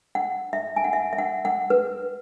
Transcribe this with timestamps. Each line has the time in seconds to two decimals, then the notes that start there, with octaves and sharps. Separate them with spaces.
0.15 F#5
0.53 E5
0.76 G#5
0.84 F#5
0.93 E5
1.13 E5
1.18 F#5
1.45 F#5
1.70 B4